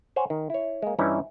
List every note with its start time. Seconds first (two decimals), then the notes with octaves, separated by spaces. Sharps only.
0.16 C5 C#5 F#5 G#5
0.30 D#3
0.50 E4 C#5
0.82 G#3 A#3
0.99 G2 E3 G3 C#4 D#4 E4